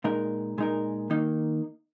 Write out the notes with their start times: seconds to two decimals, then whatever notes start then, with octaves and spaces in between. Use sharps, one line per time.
0.04 A#2 G#3 D#4 A#4
0.58 A#2 G#3 D#4 A#4
1.10 D#3 A#3 D#4